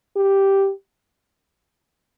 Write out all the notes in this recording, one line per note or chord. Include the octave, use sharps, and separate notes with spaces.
G4